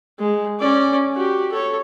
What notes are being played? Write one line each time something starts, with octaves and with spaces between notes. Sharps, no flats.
G#3
C#4 D5
F#4 G4
A4 C#5